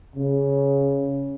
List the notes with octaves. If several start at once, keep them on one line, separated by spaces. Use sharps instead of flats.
C#3